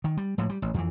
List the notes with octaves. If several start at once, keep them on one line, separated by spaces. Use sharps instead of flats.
D#3
G3
A2 F3 G#3
G3
A1
F2 E3